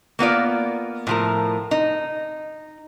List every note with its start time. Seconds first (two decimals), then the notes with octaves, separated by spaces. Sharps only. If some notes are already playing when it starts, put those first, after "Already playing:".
0.19 A#3 B3 F4 D5
1.07 A2 F3 A#4
1.71 D#4